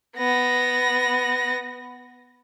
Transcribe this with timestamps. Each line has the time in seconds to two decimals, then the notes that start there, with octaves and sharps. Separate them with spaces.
0.17 B3 A#6